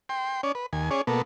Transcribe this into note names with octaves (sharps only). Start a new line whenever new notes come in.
G5 C6
C#4 C#5 D5
B4
D#2 G#5
C#4 G#4 C#5 D5
B2 A#3 B3 A4